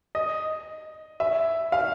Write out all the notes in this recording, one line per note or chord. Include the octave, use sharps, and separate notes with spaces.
D#5
E5
F5